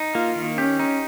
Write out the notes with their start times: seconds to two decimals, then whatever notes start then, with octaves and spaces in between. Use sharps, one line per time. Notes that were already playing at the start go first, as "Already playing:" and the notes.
Already playing: D#4
0.15 A#3 F4
0.35 D#3
0.57 C#4 G4
0.79 D#4